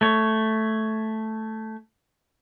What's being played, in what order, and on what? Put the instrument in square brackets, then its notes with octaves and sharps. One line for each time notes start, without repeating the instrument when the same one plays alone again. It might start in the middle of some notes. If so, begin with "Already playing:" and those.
[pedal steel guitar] A3 C#5